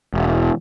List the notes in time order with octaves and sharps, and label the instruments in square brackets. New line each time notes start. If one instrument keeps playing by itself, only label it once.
[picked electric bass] E1